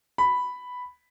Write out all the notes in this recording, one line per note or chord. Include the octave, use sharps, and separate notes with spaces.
B5